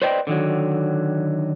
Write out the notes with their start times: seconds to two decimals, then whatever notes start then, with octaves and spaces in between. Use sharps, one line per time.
0.02 B4 C5 D5 D#5 G5
0.27 D3 D#3 F#3